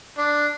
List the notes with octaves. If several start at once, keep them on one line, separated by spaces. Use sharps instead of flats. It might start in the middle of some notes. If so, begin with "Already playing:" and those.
D4